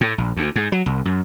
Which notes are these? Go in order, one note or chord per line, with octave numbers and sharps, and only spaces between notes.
A2
A#1
D2
G#2
F#3
C2
F#2